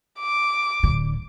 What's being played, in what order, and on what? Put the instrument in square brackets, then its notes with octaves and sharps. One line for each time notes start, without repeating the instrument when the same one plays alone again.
[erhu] D6
[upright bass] D1 D3